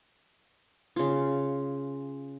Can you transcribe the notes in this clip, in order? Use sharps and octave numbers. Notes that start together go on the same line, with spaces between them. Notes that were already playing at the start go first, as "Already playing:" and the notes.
C#3 F4